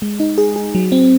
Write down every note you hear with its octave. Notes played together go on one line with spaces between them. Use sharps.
G#3
D#4
G#4
G#4
F#3
C4